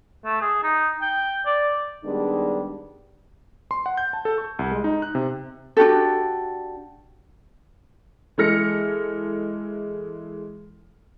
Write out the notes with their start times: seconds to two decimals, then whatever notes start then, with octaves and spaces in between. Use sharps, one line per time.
0.25 A3
0.42 G#4
0.64 D#4
1.02 G5
1.46 D5
2.05 D#3 G3 G#3 B3 D4
3.71 C6
3.86 F#5
3.97 G6
4.13 A5
4.25 A4
4.38 C#6
4.59 C2
4.72 G#3
4.84 D#4
5.02 F#6
5.15 C3
5.77 D4 F#4 G4 A4
8.38 E3 G#3 A4 F6 A#6 C#7